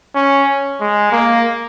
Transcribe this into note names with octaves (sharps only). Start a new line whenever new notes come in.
C#4
G#3
A#3